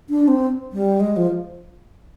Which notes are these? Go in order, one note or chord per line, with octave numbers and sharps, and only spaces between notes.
D4
C4
G3
G#3
F3